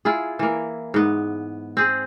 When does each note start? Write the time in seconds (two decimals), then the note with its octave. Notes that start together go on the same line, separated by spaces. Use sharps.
0.05 E4 F4 G#4
0.39 E3 A#3
0.94 G#2 B3
1.77 C4 G#4